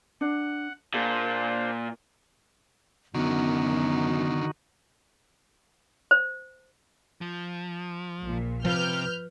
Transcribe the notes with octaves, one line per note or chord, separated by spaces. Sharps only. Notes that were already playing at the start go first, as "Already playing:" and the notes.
D4 F#5
A#2 D4 G#4 C5
F#2 D3 D#3 B3 D#4 F#4
C5
F3
A#1 A#2
C3 F3 B4 F6 G6